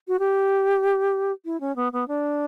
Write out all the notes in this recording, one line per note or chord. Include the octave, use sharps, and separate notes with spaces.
F#4
G4
E4
C#4
B3
B3
D4